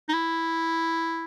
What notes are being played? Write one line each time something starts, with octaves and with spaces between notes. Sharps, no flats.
D#4
E4